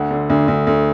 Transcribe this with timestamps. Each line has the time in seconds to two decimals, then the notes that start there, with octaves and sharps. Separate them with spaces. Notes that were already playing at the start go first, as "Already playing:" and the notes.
Already playing: D2 F#5
0.11 D3
0.30 D2
0.48 D2
0.67 D2